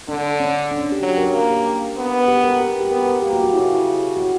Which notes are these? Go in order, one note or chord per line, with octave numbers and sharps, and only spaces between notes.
D3 D4
C#4
D4
C#4
G4
F#3 G4
A#4
A#3 A#4
G4
B3
G4
A#4
G4
G4
B3 A#4
G4
A#3 G4
F#4
F#4
C#3 E4
F#4